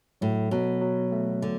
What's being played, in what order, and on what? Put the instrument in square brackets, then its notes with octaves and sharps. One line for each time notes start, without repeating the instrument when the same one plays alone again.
[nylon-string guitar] A2 [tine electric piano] F#3
[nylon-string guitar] B2 [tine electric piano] F#3
[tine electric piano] F#3
A3
[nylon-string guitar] D3